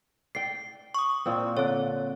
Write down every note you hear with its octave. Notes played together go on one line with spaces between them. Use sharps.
D5 G5 C7
C#6 D#6
A#2 A#3 C4
D3 C4 C#5